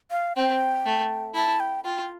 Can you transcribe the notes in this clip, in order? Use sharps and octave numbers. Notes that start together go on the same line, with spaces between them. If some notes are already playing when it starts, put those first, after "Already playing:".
F5
C4 G5
A3
E4 A5
G5
F4 G5